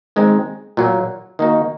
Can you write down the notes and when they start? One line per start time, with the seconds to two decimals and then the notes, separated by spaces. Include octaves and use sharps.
0.16 D#3 G#3 C4 D#4
0.77 A#2 F#3 A#3
1.39 D#3 A#3 D#4 F#4